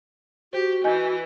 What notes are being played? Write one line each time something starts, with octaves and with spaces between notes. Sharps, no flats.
F#4 G4 C5
E3 D#5 G#5 G6